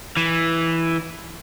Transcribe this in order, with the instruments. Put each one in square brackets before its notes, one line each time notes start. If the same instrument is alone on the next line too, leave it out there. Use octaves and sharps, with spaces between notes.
[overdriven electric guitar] E3